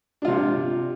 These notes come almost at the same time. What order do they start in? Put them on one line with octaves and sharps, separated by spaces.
D4 F4 C3